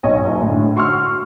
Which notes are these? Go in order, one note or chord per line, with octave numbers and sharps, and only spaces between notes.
B1 C#5 D#5 G#5
F#1
A2 D3
F#4 C6 C#6 E6 F6